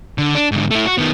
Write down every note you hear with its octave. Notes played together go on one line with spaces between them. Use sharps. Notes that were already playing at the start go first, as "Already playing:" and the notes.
D3
D4
G#2 D3
A3 E4
F#4
D#3 B3